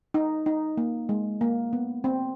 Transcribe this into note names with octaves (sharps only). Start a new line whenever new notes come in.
D#4
D#4
A#3
G#3
A#3
B3
C4